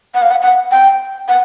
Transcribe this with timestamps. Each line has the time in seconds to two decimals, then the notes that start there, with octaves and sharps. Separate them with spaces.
0.14 F#5
0.22 F5
0.31 F#5
0.42 F#5
0.71 G5
1.28 F#5